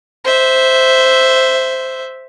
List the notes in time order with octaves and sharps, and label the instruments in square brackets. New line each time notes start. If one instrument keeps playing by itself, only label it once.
[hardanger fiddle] C5 E5